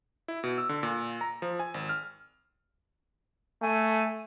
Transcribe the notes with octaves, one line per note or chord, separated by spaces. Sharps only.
E4
B2
E6
D3
A#2
A#5
F3
G#5
G#1
F6
A3 G#5